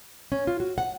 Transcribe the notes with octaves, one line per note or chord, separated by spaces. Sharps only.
C#4
F4
F#4
F#5